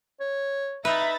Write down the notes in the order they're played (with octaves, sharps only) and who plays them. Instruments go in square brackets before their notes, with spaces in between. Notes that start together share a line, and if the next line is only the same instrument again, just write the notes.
[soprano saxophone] C#5
[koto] D#4 B4 [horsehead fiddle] E5 [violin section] A#5 B5 A6